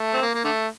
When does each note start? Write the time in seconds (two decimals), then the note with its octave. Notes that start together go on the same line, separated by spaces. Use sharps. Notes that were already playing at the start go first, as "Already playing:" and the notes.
Already playing: A3
0.14 C4
0.22 A#3
0.34 A#3
0.44 D3 A3